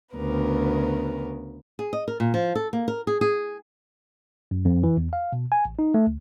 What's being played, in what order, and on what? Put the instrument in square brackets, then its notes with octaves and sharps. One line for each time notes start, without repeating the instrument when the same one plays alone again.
[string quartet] D2 C#3 B3 A#4 B4
[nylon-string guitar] G#4
D#5
A#4
A#2
F3
A4
A#3
A#4
G#4
G#4
[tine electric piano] F#2
F2
E3
E2
F5
B2
G#5
A1
D#4
A3
D2